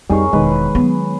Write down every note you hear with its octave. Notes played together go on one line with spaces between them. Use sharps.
F2 G3 C4 D#4 G#4 A#4 C#5
E1 D#3 G#3 B4
F#3 B3 B4